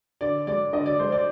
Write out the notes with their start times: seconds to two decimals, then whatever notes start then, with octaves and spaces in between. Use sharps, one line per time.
0.21 D3 D5
0.47 G#3 D5
0.73 D3 D#5
0.86 D5
0.99 G#3 C5
1.12 D5